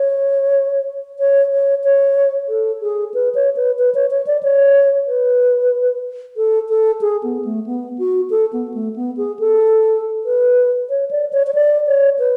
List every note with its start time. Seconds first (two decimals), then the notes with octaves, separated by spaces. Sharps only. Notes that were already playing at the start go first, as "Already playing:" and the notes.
Already playing: C#5
1.19 C#5
1.52 C#5
1.84 C#5
2.49 A4
2.82 G#4
3.14 B4
3.35 C#5
3.56 B4
3.79 B4
3.95 C#5
4.11 C#5
4.27 D5
4.43 C#5
5.08 B4
6.37 A4
6.69 A4
7.01 G#4
7.23 B3
7.45 A3
7.66 B3
7.98 F#4
8.30 A4
8.53 B3
8.74 A3
8.96 B3
9.17 G#4
9.39 A4
10.25 B4
10.90 C#5
11.11 D5
11.33 C#5
11.47 C#5
11.55 D5
11.87 C#5
12.19 B4